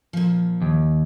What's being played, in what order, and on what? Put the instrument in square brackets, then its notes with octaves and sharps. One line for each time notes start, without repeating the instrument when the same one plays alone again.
[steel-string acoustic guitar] A#2 F3
[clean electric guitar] D#2